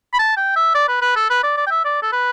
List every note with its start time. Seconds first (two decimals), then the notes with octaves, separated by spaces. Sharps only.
0.14 B5
0.19 A5
0.37 G5
0.56 E5
0.75 D5
0.88 B4
1.02 B4
1.16 A4
1.30 B4
1.43 D5
1.57 D5
1.67 G5
1.71 E5
1.85 D5
2.02 A4
2.12 B4